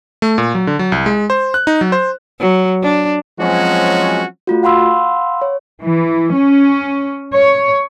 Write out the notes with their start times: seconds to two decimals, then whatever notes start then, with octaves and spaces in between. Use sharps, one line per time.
0.22 A3
0.38 A#2
0.55 F#3
0.67 D3
0.79 F#3
0.92 C2
1.06 G#3
1.30 C5
1.54 F#6
1.67 D#4
1.81 F#3
1.92 C5
2.40 F#3
2.83 D4
3.40 F3 F#3 G#3 C4 C#4 F#4
4.47 A3 F4 F#4
4.63 F5 F#5 B5 C6 E6
5.42 C#5
5.82 E3
6.33 C#4
7.35 C#5